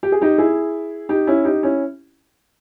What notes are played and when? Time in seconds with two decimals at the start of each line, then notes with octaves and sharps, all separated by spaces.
0.03 G4
0.12 G#4
0.22 D#4 G4
0.38 E4 G#4
1.09 D#4 G4
1.27 C#4 E4
1.45 D#4 G4
1.63 C#4 E4